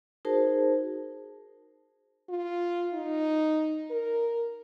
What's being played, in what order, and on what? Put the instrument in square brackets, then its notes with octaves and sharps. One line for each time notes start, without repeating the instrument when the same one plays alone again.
[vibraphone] D#4 F#4 G#4 A#4 C5 A5
[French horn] F4
D#4
A#4